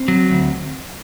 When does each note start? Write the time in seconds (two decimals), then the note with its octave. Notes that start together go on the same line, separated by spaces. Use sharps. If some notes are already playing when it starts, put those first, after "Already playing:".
Already playing: C4
0.08 F#3
0.30 D2